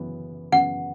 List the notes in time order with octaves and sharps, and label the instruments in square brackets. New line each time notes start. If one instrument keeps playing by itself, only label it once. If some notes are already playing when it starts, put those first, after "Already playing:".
Already playing: [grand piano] F#2 C#3 E3 B3
[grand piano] F#2 C#3 E3 B3 [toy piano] F#5